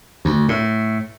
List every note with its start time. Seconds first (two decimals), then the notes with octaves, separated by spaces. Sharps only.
0.25 D2
0.49 A2